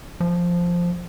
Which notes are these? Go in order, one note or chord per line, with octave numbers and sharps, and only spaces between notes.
F3